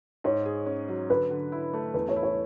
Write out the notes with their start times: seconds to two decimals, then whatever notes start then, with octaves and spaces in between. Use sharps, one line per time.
0.24 G#2 C#5
0.45 G#4
0.66 C#4
0.89 F#3
1.10 D3 B4
1.30 D3
1.52 E4
1.74 A3
1.94 E2 B4
2.08 C#5
2.16 E4
2.23 C#5